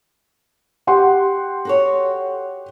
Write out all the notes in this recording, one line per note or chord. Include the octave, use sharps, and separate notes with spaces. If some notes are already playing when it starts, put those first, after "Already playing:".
G4 F#5 C6
F#4 A4 C#5